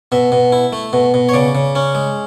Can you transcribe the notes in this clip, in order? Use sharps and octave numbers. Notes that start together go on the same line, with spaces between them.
B2 E5
B2
E4
A3
B2
B2
C#5
C#3 D5
C#3
C#4
G#3